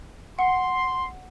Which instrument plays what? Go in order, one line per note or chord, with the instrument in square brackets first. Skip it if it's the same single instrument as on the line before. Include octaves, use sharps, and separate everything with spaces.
[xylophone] F#5 [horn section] C6